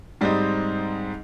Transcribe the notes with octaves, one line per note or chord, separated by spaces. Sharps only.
G#2 G3 C4 D#4